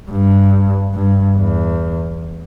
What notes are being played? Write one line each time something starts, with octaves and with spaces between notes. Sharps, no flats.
G2
G2
E2